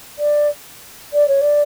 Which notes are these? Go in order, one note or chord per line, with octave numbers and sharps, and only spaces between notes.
D5
D5
C#5
D5